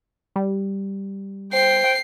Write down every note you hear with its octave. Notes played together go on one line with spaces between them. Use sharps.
G3
C5 G5 C7